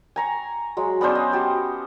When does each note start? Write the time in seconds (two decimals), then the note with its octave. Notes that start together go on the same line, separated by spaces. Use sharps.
0.16 G#5 A#5 C#6
0.77 F#3 G#3
1.01 B3 C#4 D4 C5
1.15 D#5
1.32 F#4 G4 A5